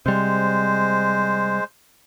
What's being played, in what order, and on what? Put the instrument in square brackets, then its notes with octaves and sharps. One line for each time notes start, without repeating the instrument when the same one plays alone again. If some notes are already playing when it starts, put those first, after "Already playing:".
[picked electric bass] C3 G3 [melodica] G#3 C5